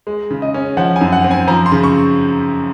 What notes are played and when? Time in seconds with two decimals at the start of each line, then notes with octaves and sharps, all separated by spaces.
0.07 G#3
0.31 C#3
0.42 D#5
0.54 C#4
0.77 F3 F#5
0.96 G#5
1.01 F#2
1.12 F#5
1.24 C4
1.31 G#5
1.47 F3 A#5
1.66 C6
1.72 C#3
1.83 C#6